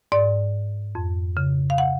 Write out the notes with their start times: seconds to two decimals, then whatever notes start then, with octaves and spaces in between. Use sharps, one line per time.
0.12 G#2 D5
0.95 F2
1.37 C#3
1.70 F5
1.78 F#5